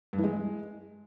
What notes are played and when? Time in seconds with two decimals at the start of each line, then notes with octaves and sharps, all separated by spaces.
0.13 G2
0.18 E3
0.24 G#3